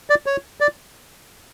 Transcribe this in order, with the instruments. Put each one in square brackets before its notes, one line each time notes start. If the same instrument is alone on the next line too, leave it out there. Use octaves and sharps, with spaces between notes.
[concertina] D5
C#5
D5